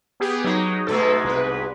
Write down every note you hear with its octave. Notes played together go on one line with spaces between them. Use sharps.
B3 G4 G#4
F#3 G#3 D#4
G#2 B2 G#3 A3 A4
C2 B4